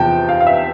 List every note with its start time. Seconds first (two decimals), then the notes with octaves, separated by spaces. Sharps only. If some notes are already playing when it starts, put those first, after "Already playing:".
Already playing: E2 C3 F3 G5 A5
0.29 F5
0.40 F5
0.47 E5